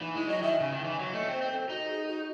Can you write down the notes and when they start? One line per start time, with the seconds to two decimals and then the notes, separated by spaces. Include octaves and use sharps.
0.01 E3 D#4
0.14 G#3 E4
0.28 F#3 D#5
0.43 D#3 E5
0.60 C#3
0.71 D#3
0.84 E3
0.99 F#3
1.13 A3 D#5
1.27 C4 C5
1.42 C4
1.51 A4
1.69 D#4 F#4
1.88 G#4
2.07 F#4